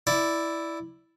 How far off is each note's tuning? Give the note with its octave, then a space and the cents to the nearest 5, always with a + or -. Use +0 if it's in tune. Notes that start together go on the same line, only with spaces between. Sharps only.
E4 +0 D5 +0